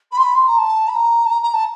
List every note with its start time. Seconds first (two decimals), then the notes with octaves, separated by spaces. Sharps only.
0.11 B5
0.17 C6
0.22 B5
0.34 C6
0.47 A#5
0.58 A5
0.88 B5
0.95 A#5
1.26 A5
1.30 A#5
1.42 A#5
1.53 A5